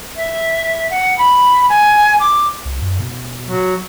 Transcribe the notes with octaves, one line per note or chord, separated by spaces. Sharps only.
E5
F#5
B5
G#5
D6
C2
F#2
B2
F#3